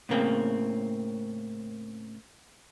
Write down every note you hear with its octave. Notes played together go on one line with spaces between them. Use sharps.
A2 C#3 A#3 C4